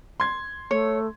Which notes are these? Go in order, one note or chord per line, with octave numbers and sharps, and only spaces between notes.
C6 G#6
A3 C#5